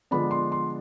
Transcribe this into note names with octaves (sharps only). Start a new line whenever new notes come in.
D3 F3 G#3 B3 D4 B5
C6
C6